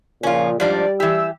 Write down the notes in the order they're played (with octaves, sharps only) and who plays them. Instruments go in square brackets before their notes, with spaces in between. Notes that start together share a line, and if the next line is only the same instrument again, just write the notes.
[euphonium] A#2 [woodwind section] C#3 F3 [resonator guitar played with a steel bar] C#4 F4
[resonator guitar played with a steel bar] G#2 F3 D4 [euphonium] G3 [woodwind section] D5
[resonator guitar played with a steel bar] E3 G4 [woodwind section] E6